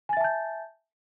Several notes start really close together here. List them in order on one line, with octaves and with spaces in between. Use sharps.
G#5 A6 E5 A5 G6